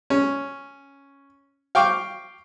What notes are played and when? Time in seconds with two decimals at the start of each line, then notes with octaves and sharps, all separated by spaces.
0.10 C#4
1.75 F5 G5 C#6 D6